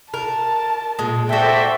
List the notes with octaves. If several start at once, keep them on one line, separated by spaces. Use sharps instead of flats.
A#4 A5
A#2 G#3
D4 F#4 A4 C5 D5 E5 G5